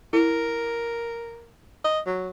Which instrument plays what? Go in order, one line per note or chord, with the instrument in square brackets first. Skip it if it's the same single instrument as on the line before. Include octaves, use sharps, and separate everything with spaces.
[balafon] E4 [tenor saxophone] A#4
[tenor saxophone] D#5
F#3